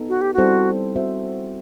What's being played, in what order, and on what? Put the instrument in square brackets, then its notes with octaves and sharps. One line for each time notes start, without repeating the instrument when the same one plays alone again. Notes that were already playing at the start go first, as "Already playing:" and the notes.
Already playing: [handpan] B3 D#4 A4
[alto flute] F#4
G4
[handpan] G3 C4 E4 A4 C5 [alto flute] F#4
[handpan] C4 F#4 C5 E5